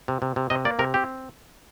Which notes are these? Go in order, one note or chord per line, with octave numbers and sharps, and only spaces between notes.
C3
C3
C3
C3 D#5
A#3 D5
C3 A#4
C4 G4